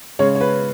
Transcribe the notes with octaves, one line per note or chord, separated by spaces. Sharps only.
C#3 G#3 C#5
C#5
B4